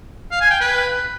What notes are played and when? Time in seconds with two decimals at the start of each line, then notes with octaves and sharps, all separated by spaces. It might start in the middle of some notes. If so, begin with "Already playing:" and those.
0.31 F5
0.41 G#5
0.51 G5
0.60 B4